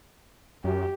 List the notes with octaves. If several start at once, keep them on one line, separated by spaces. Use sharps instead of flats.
F#2 G4